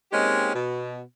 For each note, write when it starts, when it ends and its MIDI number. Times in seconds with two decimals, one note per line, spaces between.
0.12 0.53 56
0.12 0.53 58
0.12 0.53 60
0.12 0.53 61
0.12 0.53 63
0.12 0.53 67
0.54 0.99 47